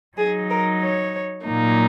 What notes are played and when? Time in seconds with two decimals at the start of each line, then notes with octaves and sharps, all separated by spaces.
0.17 F#3 D#4 G#4
0.49 A#4
0.81 C#5
1.45 A#2 F#3 A#3 D#4